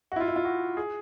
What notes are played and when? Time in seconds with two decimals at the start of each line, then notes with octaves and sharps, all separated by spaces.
0.12 F#4
0.16 E4
0.20 F4
0.28 E4
0.36 F4
0.45 F#4
0.77 G#4